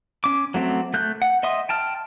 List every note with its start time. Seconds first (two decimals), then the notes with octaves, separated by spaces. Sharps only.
0.24 C#4 D6
0.54 F#3 A3 C4
0.94 A3 F#6 G6
1.22 F#5
1.43 D#5 E5 C6 D#6
1.69 G5 A5 F6